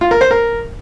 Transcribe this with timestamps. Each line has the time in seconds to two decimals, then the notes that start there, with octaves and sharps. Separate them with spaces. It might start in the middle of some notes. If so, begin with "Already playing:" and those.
0.01 F4
0.11 A#4
0.21 C5
0.31 A#4